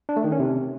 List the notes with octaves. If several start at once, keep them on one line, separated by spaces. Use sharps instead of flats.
D4
A3
D#3
C#4
C3